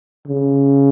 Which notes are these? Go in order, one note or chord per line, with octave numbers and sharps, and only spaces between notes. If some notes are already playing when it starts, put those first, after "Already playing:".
C#3